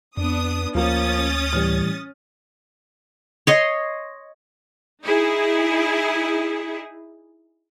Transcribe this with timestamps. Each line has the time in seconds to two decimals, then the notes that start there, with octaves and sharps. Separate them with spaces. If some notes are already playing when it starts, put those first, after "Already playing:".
0.17 F2 B3 D4 D#6
0.75 D2 F3 A#3 C#4 D#6 A6
1.53 A2 E3 G3 F6
3.47 C#5 D#5 C6
5.03 D#4 E4 G#4